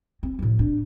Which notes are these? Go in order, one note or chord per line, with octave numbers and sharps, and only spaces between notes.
C4
A2 F3
D4